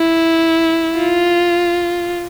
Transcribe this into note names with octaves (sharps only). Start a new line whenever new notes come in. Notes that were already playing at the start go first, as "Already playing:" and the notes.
Already playing: E4
F4